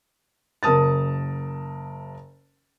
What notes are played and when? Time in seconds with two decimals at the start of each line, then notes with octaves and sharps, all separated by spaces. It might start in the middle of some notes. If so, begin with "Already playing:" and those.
0.63 F#1 A#4 A5 D#6 A6